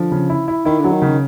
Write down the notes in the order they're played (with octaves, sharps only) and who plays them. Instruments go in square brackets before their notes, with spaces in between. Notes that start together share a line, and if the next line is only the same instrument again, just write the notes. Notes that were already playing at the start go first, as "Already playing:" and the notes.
Already playing: [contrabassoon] D3 [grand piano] F3
[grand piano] C#3
E4
E4
[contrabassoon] D#3 [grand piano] E4
[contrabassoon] D3
[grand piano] F#3
[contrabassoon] D#3
[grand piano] C#3